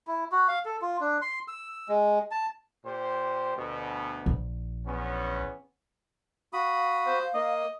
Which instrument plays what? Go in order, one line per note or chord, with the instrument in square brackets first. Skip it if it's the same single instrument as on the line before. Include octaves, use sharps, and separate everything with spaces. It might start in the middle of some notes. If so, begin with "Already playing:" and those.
[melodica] E4
F#4
F5
A4
F4
D4
C6
E6
G#3
A5
[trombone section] A#2 G4 C5
D2 B2
[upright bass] A#1
[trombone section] E2 B3 C#4
[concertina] F#4 B5 D#6 [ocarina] F5
[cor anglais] C5
[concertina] A#3 [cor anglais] D#5